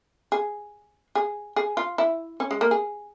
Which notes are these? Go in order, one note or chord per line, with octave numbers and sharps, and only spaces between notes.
G#4
G#4
G#4
F4
E4
C#4
G#3
A#3
G#4